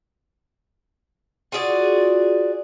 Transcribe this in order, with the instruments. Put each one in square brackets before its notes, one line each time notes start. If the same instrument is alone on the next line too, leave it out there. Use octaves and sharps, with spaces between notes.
[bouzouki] F4 F#4 G#4 D5